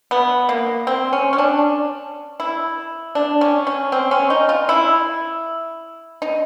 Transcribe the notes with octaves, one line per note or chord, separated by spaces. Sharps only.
B3
A#3
C4
C#4
C#4
D4
E4
D4
C#4
C#4
C4
C#4
D#4
F4
E4
D#4